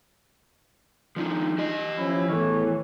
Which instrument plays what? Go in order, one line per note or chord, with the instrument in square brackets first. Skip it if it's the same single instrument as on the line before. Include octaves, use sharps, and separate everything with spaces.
[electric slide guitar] F3 D4 D#4
G4 D#5
[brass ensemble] F3 C#4 E4
[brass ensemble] E2 A2 C#5 [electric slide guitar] E3